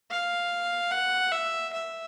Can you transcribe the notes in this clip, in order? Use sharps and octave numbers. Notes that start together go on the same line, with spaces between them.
F5
F#5
E5
E5